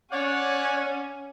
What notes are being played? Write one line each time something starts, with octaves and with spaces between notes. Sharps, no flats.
C#4 C#5 D5 F#5